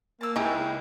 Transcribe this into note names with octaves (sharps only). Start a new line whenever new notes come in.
A#3 A5 E6
C#2 C#3 D#4 E4 G4 G#4